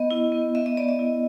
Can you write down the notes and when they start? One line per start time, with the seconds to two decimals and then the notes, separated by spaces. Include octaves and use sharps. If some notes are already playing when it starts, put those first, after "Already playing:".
Already playing: B3 D#5
0.11 E4
0.32 B3
0.55 B3 E5
0.66 D#5
0.77 B3 D5
0.89 D#5
0.99 E4